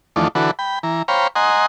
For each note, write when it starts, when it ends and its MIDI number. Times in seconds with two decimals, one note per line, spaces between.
0.16 0.28 40
0.16 0.28 51
0.16 0.28 53
0.16 0.28 57
0.16 0.28 62
0.35 0.51 50
0.35 0.51 52
0.35 0.51 66
0.35 0.51 69
0.35 0.51 71
0.59 0.79 79
0.59 0.79 83
0.83 1.02 52
0.83 1.02 82
1.08 1.27 72
1.08 1.27 73
1.08 1.27 77
1.08 1.27 79
1.08 1.27 82
1.08 1.27 83
1.36 1.66 75
1.36 1.66 78
1.36 1.66 80
1.36 1.66 82
1.36 1.66 84